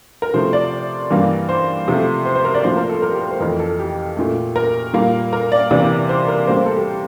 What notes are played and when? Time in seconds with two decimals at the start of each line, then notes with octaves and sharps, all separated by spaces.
0.22 A#4
0.34 C3 F3 A3 C5
0.53 D5
1.10 G2 E3 G3 A#3
1.49 C5
1.88 C3 F3 A3
2.25 C5
2.35 C5
2.45 A#4
2.54 D5
2.64 A2 F3 A#3 C5
2.77 A#4
2.89 A4
3.02 A#4
3.12 G4
3.21 A#4
3.31 C5
3.40 F2 E3 A3 A#4
3.60 A4
3.79 G4
4.17 A#2 A3
4.56 A#4
4.93 A#2 G3 A#3
5.33 A#4
5.52 D5
5.71 C3 E3 A#3 D5
6.09 C5
6.28 A#4
6.47 A2 G3 A#3 C5
6.57 C5
6.66 A4
6.76 G4